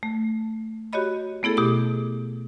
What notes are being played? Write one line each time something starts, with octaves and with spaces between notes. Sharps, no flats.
A3
F#4 G4 C#5 D#5 B5
A3 B3 E4 G#4 A4
B2 G4 D6